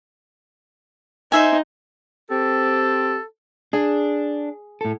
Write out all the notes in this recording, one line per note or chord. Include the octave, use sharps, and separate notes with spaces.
D#4 C5 E5 G#5
C4 G4 A4
D4 G#4
A2 A4